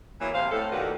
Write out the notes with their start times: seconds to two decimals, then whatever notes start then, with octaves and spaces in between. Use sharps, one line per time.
0.21 E2 E3 F#3 A#3
0.34 A2 C3 C5 F5
0.51 A2 A4
0.72 D#2 A#2 D#3 G3 F#4 B4